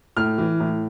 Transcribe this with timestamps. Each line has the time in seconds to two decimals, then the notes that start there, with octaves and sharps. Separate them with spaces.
0.16 A2 F6
0.38 E3
0.60 A2